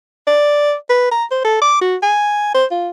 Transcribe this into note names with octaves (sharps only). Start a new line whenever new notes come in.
D5
B4
A#5
C5
A4
D6
F#4
G#5
C5
F4